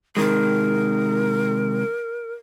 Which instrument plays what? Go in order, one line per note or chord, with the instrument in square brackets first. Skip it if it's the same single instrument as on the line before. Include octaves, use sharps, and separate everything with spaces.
[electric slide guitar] C3 D#3 G#3 [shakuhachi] A#4